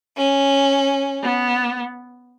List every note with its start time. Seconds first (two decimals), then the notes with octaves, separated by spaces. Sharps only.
0.17 C#4
1.23 B3